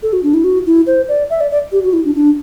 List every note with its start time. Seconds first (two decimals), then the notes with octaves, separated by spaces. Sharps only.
0.03 A4
0.13 F#4
0.23 D4
0.34 E4
0.44 F#4
0.66 E4
0.87 C5
1.08 D5
1.30 E5
1.41 D5
1.51 D5
1.72 G4
1.83 F#4
1.93 E4
2.05 D4
2.15 D4